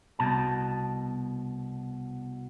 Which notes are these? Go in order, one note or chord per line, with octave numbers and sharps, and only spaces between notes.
C2 B2 A5